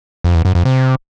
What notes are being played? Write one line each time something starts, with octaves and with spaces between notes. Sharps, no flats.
F2
E2
F#2
F2
C3